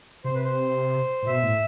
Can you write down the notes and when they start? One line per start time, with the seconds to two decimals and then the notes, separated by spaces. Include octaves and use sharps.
0.24 C3 C5
0.35 B4
0.44 C5
1.23 A2
1.27 B2 E5
1.43 A2